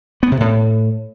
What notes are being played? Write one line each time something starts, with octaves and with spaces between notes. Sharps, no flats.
B3
C3
A2